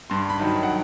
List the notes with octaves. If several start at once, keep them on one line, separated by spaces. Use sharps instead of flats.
G2 C6
B5
D#3 F#3
F#5